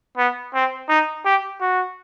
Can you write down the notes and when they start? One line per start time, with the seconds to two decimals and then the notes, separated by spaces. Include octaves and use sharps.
0.17 B3
0.54 C4
0.89 D#4
1.25 G4
1.61 F#4